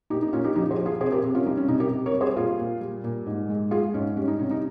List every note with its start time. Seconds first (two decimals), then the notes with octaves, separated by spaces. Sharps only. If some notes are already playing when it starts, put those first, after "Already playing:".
0.10 A#2 D#4 G4
0.22 D#4
0.33 A#2 C#4 F4
0.44 D#4 G4
0.55 F3 D#4 G4
0.71 G#4 C5
0.78 F3
0.86 F4 G#4
1.01 C3 G#4 C5
1.12 G4 A#4
1.23 C3
1.35 C#4 F4
1.46 G3 D#4
1.57 C#4
1.68 C3 D#4
1.80 G4 A#4
1.91 C3
2.06 A#4 C#5
2.13 G3
2.21 G#4 C5
2.36 A#2 F4 G#4
2.59 A#2
2.81 G3
3.04 A#2
3.26 G#2
3.49 G#3
3.71 G#3 F4 G#4
3.94 G#2 C#4
4.17 G3 C#4
4.28 D#4
4.39 C3 C#4
4.51 D#4